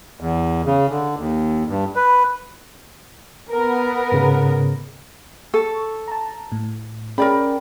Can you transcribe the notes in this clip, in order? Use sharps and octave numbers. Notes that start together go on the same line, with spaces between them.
E2
C#3
D3
D#2
G2
B4
B3 A#4
G#2 C#3
A4 C#6
A5 A#5
A2
C#4 G#4 A#4 D5 G5 B5